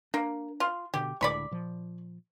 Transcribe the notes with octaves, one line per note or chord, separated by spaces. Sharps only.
A#3 D4
F4
B2 D3 G4
C#2 A2 D3 D5 B5 C#6
A#2 F3